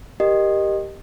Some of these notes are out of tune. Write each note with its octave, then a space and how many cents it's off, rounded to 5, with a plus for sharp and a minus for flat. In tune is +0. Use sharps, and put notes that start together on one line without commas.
G4 +0 A#4 +0 D#5 -15